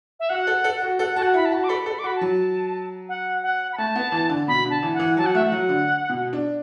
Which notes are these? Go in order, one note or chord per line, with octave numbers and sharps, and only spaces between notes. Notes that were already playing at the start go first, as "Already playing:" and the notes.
E5
F#4 F#5
A4
A4
F#4
A4 F#5
F#4 A5
F#5
E4 B5
A5
F#4
D6
A4 B5
A4
B5
D6
F#4 B5
A5
F#3
F#5
F#5
B5
A3 A5
B3
E3
D3
B2 B5
D3
A5
E3
F#5
E3
F#3 A5
F#5
A3 E5
F#5
F#3
D3
B2
D4